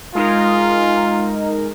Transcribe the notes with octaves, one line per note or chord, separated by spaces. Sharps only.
G#3 D#4 F4 A#4